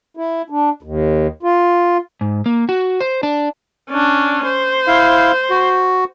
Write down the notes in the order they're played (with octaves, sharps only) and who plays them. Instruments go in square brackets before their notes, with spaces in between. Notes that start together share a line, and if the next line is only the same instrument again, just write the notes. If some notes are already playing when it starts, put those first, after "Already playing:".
[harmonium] E4
D4
D#2
F4
[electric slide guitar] G#2
A#3
F#4
C5
D4
[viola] C#4 D4
C5
[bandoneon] E4 F5
F#4